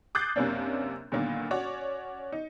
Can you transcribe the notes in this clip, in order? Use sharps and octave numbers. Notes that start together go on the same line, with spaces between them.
D6 D#6 F#6 G6 A6 C7
F#2 C3 A#3 C#4 D4
A#2 D3 D#3 F#3 A#3 B3
C#4 F#4 C#5 D5
D#4